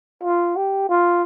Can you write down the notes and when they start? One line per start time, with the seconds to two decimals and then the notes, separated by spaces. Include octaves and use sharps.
0.23 F4
0.56 G4
0.89 F4